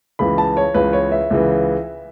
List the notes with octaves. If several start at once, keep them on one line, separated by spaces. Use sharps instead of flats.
C#2 C#3 E3 B5
A5
C#5
C#2 C#3 E3 B4
C#5
E5
C#2 C#3 E3